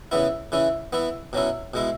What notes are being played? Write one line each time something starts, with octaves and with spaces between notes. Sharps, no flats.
C#3 E3 B3 E4
C#3 E3 C#4 E4
E3 B3 E4
B2 F#3 C#4 E4
B2 G#3 E4